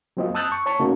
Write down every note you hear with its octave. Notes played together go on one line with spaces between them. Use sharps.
F#3 A#3 C4 F4 D#5
A5 D#6 E6 F#6 G6 A6
C#6
C#5 A5 C#6
C3 A3 A#3 C#4 D#4 F#4